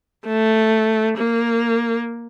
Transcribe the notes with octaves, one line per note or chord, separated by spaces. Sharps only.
A3
A#3